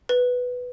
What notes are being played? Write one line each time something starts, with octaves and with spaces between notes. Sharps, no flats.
B4